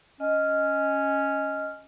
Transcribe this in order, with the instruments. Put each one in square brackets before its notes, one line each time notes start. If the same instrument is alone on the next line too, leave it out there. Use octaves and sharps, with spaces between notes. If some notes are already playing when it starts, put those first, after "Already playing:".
[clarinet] C#4 [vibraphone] D#5